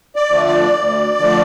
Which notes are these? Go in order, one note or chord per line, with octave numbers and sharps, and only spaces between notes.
D5
D3 F3 A3
D5
D2
D3 F3 A3